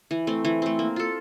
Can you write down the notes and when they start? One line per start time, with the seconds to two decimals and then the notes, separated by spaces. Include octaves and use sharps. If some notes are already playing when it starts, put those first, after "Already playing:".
0.11 E3
0.27 A3 C4
0.45 E3
0.62 A3 C4
0.79 A#3
0.96 F4 A4